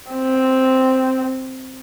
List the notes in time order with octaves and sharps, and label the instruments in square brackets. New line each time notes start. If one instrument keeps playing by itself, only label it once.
[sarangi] C4